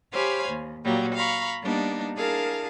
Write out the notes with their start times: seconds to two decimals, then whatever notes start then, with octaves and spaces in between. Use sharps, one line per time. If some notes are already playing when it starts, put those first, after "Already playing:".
0.11 G4 C5 C#5 F5 G#5 B5
0.48 D#2
0.84 A#2 F#3 G3 A#3
1.14 F5 A#5 B5 C#6
1.61 G3 A#3 B3 D4 D#4
2.15 D4 E4 G#4 A#4 F5 A5